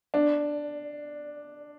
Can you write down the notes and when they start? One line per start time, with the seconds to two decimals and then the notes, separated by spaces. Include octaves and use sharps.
0.14 D4